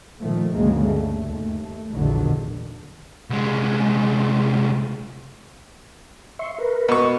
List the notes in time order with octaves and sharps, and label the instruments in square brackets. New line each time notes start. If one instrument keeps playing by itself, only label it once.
[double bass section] A#2 D#3 F3 A3
D2 G2 C#3 G#3 A#3
A3
D#2
A3
A#1 E2 A2 D3 D#3 F#3
[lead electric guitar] C2 G#3
[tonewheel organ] E5 C6 C#6
A#4 B4
[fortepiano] B2 C#6